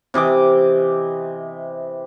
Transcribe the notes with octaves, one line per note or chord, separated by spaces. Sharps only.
C3 E3 D#5 D6